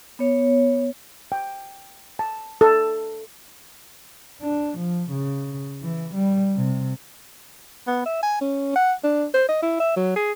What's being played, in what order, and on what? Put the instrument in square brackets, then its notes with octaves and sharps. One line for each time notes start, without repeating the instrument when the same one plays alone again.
[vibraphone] B3 C#5
[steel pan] G5
A5
A4
[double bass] D4
F3
C#3
E3
G3
C3
[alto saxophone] B3
E5
G#5
C#4
F#5
D4
C5
D#5
E4
E5
F#3
G#4